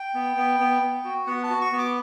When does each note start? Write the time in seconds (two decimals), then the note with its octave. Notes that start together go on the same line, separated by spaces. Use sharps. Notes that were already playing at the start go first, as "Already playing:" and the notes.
Already playing: G5
0.14 B3
0.37 B3
0.60 B3
0.82 B3
1.04 F#4
1.27 B3 F#5
1.43 A5
1.50 F#4
1.61 C#6
1.72 B3
1.78 D6